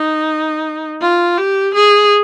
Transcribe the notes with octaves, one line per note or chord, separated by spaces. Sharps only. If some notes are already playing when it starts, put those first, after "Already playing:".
Already playing: D#4
F4
G4
G#4